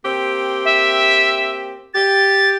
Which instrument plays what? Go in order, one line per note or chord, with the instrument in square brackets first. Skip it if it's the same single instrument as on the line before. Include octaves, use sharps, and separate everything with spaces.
[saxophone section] A#3 C4 G4
[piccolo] E5
[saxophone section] G4 [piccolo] A6